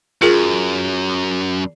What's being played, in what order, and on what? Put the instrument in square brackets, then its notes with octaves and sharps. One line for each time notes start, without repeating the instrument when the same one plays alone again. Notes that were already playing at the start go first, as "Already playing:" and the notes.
[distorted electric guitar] F#2 [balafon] F4 G#4 A#4